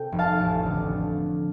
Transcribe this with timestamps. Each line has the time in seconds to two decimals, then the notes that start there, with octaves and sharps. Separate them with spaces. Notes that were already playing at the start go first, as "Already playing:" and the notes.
Already playing: C3 A4 G5
0.12 F1
0.19 F5 A5
0.39 A1
0.66 D3